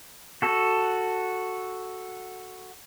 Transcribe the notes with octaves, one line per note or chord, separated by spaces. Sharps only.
F#4 A4